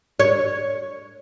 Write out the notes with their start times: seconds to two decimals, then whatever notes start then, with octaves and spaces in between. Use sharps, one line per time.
0.19 C#5